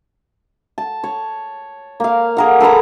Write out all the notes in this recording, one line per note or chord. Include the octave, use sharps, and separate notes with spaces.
A5
C#5
A#3 F5
G#4 A#4 F#5
A4 B4 A#5 B5